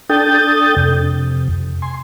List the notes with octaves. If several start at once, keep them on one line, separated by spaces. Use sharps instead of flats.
D4 A4 G5 D#6 G6 A6
F2 C3
G#5 C6